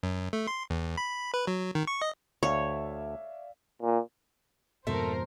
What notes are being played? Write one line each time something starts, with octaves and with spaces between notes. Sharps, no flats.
F#2
A3
C6
E2
B5
B4
F#3
D#3
C#6
D#5
D2 C#5 D5 E5 F5
A#2
F2 G#2 B2 A3 A#4 C5